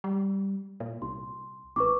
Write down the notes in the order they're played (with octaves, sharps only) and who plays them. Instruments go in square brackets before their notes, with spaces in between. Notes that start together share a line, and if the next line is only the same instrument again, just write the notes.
[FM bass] G3
A#2
[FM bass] C2 [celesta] C6
[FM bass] A1 [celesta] B4 C#6 D6